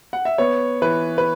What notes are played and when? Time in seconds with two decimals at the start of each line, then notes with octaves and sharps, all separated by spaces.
0.13 F#5
0.25 E5
0.38 B3 C#5
0.82 E3 B4
1.18 B4